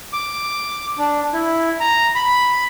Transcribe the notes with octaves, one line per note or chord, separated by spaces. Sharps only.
D6
D4
E4
A#5
B5